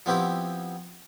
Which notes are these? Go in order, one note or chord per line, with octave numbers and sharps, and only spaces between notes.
F3 B3 C4 E4 G4